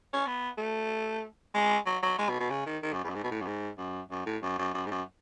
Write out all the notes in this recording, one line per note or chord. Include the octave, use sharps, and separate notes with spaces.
C#4
B3
A3
G#3
F#3
F#3
G#3
B2
B2
C#3
D#3
D#3
F#2
E2
F#2
G#2
B2
A2
F#2
G#2
F#2
F#2
A2
F#2
F#2
F#2
G#2
F#2